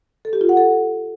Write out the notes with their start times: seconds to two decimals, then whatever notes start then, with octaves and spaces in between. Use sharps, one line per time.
0.25 A4
0.33 G4
0.41 F4
0.49 F#5
0.57 A4